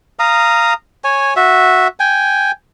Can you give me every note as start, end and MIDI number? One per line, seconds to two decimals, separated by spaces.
0.19 0.73 77
0.19 0.73 82
0.19 0.73 87
1.04 1.34 73
1.04 1.34 80
1.36 1.87 66
1.36 1.87 76
2.00 2.51 79
2.00 2.51 80